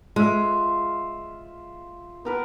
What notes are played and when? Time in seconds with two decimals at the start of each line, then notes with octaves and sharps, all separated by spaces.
0.16 G#3 F4 E5
2.25 B3 A#4 B4